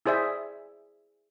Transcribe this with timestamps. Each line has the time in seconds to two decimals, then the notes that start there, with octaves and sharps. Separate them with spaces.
0.06 E4 G#4 C5 D5 E5